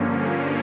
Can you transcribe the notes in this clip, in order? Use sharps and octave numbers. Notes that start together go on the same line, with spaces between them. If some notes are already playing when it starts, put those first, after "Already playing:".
Already playing: G2 D3 F3 A#3 C#4